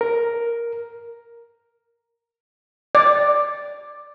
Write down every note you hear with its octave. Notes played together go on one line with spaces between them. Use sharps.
A#4
D5